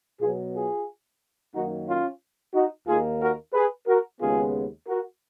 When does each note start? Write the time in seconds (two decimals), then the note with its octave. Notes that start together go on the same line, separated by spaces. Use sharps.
0.20 B2 F#3 B3 F4 G#4
0.54 F4 G#4
1.54 F#2 D#3 F#3 A#3 D#4 F#4
1.87 C#4 F4
2.54 D#4 F#4
2.87 D#2 D#3 A#3 F4 G#4
3.20 F#4 A#4
3.54 G#4 B4
3.87 F#4 A#4
4.20 D#2 C#3 G#3 B3 F4 G#4
4.87 F#4 A#4